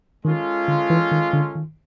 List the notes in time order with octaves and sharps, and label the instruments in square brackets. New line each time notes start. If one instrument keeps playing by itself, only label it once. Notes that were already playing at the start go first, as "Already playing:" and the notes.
[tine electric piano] D#3 [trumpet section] G#3 C#4 F4 A4
[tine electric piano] D3
E3
D#3
D3
D#3